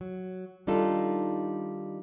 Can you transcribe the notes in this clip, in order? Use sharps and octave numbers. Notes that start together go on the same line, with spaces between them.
F#3
D#3 G3 D4 D#4 F4 A4